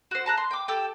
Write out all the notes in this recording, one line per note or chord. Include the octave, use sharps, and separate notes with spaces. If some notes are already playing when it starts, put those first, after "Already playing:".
F#4 C5
A5 A#5 F#6
C6
G5 D6
G4 A4 G5